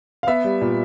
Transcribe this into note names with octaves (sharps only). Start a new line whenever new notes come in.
F5
B3 E5
G3
A#2